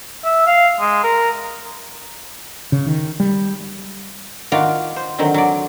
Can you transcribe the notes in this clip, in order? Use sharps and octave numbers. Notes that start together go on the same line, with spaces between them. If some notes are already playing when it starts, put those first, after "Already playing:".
E5
F5
G#3
A#4
C#3
D#3
G3
D#3 F4 F#4 D5 F5
C5
D3 D#3 F#3 C4
F#3 D5